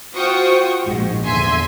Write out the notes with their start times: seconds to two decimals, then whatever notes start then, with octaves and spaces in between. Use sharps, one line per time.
0.15 F4 F#4 C5 G5 C#6 D#6
0.87 A#1 G#2
1.25 E2 D3 E5 G#5 C6